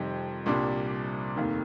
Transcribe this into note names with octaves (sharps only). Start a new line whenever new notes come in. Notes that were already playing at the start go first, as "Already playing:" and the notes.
Already playing: F2 C3 D#3 G3
C2 A#2 G3 D4
F1 D#2 D#3